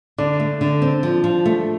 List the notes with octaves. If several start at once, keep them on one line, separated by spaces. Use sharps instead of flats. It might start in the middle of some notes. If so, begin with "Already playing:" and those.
D3 D4
A3
D3
C4
F3
F3
A3